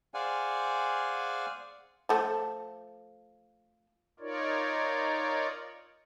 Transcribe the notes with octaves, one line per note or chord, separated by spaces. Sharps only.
G#4 C5 D5 F5 F#5 G#5
F3 A3 A4
D#4 F4 A#4 C#5 D5